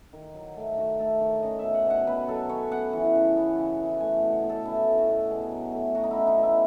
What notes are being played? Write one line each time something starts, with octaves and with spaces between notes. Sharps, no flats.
D#3
F#3
A3
D#3 F#4
A3 A4
D#3 C#5
C#4 D#5
B2 E5
F#5
B2 F#5
B2 B4
F#3 A4
C#4 C#5
B3 F#5
E3
C#3
B3
C#3
E3
A3 G#5
F#5
B2
C#5
B2
A4
C#4 E4
A3
F#4
B2
B2 G#4
F#3
A3
F#3 F#4
D#4
E4
C#4
D#4
B2 E4